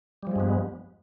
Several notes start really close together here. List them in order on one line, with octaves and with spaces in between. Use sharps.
G3 F3 G#3 G2 B3